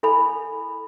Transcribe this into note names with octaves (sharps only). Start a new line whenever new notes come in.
E4 A4 G#5 B5